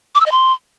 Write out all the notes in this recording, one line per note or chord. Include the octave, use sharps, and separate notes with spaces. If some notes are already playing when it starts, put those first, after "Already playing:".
D6
E6
D#5
C6